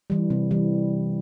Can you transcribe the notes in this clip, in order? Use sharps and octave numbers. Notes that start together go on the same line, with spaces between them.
E3 G3
C3
E3 G3